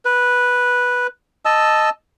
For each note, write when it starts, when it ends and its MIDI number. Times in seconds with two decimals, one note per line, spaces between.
0.05 1.07 71
1.45 1.90 75
1.45 1.90 81
1.45 1.90 88